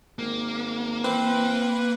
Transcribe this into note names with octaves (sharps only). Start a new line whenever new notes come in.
G#1 A#3
E3 C4 B4